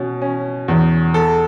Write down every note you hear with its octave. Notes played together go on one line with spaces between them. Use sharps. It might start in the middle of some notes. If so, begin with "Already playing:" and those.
Already playing: B2 C#4
C#4
E2
A4